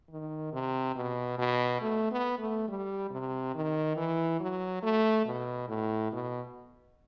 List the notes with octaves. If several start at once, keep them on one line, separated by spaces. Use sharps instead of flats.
D#3
C3
B2
B2
A3
B3
A3
G3
C3
D#3
E3
F#3
A3
B2
A2
B2